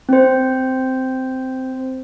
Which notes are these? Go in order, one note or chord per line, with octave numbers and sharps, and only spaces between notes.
C4 C5